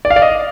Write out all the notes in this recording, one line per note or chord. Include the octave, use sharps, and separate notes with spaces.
D5
F5
D5
D#5